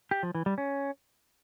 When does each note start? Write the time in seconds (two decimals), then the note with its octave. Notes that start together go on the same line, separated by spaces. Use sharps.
0.11 G4
0.23 F3
0.35 E3
0.46 G3
0.58 C#4